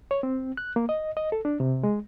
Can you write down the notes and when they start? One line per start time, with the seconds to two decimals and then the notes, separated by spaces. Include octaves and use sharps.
0.11 C#5
0.23 C4
0.57 F#6
0.76 A#3
0.89 D#5
1.17 D#5
1.32 A4
1.45 D4
1.60 C3
1.83 G#3